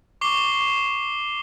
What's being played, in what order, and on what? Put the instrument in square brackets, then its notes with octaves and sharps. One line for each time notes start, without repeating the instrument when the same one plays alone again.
[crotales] C#6 D6 C7 G7